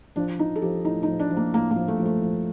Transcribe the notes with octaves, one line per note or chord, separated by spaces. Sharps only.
F3 D4
F3 D#4
A4
F3 G4
A2 D#4
D#4
F3
D4
F3
A#3
A2 A#3
A#3
F3
A3
F3
A3
F3